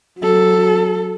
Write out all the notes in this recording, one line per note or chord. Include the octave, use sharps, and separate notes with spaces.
F#3 A4